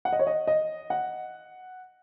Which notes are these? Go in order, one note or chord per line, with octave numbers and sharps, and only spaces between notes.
F#5
D#5
C#5
D#5
D#5
F#5